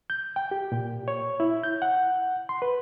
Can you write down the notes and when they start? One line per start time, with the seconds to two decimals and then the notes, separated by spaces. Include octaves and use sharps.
0.10 G6
0.36 G5
0.51 G4
0.72 A#2
1.08 C#5
1.40 E4
1.64 G6
1.82 F#5
2.49 C6
2.62 B4